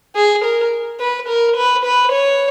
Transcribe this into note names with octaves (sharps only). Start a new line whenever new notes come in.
G#4
A#4
B4
A#4
B4
B4
C#5